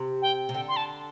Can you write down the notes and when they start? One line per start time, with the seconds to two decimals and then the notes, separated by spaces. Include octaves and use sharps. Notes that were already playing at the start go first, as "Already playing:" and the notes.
Already playing: C3
0.22 G5
0.49 C3
0.54 D3 G5
0.68 C6
0.76 A5